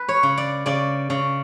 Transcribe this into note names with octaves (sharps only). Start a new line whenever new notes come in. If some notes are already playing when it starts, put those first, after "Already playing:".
Already playing: B4
C#5
C#3
D5
C#3 D5
C#3